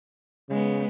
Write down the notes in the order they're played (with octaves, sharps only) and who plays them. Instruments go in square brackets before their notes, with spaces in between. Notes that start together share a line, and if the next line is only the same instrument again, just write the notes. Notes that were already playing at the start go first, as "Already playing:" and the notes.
[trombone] C#3 [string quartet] G#3 B3